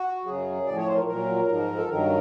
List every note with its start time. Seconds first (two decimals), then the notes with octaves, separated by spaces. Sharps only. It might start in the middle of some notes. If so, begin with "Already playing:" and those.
Already playing: F#4
0.25 F#2 C#3 F#3 G#4
0.66 A2 F3 D5
0.77 C#5
0.88 C5
0.97 A#4
1.07 A#2 F#3 A#4
1.48 G#2 F3
1.77 A4
1.89 G2 D#3 F#3 A#4